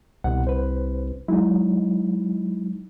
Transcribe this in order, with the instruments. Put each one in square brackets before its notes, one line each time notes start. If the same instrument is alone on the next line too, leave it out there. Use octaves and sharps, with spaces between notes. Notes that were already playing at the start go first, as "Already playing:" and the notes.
[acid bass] C2 [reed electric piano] B2 F#5
[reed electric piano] B4 C5
[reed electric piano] F#3 G#3 D#4 [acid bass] E4